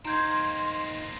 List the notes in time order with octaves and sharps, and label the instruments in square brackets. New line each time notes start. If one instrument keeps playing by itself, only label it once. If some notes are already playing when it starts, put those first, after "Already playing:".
[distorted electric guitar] A#3 C4 [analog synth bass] D#4 [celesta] A#5 G6 G#6 [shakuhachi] C6